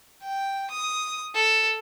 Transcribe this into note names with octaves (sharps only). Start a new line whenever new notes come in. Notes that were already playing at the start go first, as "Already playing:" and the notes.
G5
D#6
A4